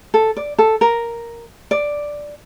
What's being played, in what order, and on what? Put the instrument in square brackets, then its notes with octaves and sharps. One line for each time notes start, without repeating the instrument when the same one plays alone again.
[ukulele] A4
D5
A4
A#4
D5